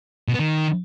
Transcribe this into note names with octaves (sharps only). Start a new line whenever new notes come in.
B2
B3
D#3